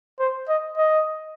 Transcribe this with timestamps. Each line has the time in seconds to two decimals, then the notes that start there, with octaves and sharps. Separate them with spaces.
0.19 C5
0.48 D#5
0.77 D#5